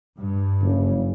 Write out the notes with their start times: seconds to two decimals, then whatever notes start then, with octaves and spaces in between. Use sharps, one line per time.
0.18 G2
0.60 F#1 C#3